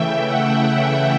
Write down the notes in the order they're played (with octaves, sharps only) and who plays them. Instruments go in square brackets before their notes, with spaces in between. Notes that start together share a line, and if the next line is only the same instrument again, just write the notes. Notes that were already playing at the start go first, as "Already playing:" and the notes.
Already playing: [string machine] C#3 E3 A3 E5 G5
F#5